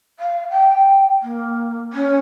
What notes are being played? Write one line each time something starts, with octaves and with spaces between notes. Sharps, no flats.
F5
G5
A#3
C#4